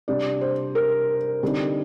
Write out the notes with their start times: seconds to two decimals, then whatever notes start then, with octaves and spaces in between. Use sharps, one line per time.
0.08 C3 G3 D4 D5
0.41 C5
0.75 A#4
1.43 D3 G3 C4 D#4